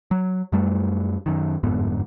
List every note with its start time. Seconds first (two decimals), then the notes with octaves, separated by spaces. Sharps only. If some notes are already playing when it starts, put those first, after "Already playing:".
0.11 F#3
0.52 F#2 G3 A3
1.26 F#2 D#3
1.63 G1 F2 G#2 B3